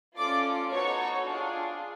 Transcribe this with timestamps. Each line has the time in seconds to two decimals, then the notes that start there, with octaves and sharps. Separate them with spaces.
0.18 A3 C#4 F4 A4 D5 D6
0.72 B3 D#4 F#4 A4 C#5 C#6
1.26 D4 F4 G#4